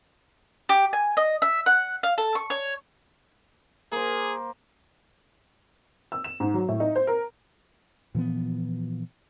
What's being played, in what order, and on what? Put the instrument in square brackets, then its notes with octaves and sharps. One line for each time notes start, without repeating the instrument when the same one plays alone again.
[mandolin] G4
G#5
D#5
E5
F#5
F5
A4
C#6
C#5
[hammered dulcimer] A#3 C5 [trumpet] G#4
[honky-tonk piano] E6
E7
G#2
F#3
A2
D#4
C5
A#4
[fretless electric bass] A#2 E3 F3 B3